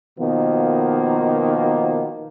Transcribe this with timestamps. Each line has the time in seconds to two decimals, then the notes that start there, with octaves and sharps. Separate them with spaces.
0.18 B2 D#3 F3 A#3 B3